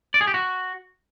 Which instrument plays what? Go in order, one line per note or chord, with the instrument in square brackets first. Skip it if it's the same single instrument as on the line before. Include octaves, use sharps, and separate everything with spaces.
[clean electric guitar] D5
G#4
G4
F#4